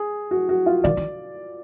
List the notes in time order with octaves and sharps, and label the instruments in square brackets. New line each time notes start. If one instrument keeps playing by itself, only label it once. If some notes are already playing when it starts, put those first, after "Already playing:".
Already playing: [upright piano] G#4
F#4
F#4
F4
[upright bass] D#3 [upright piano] D5
[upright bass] D#3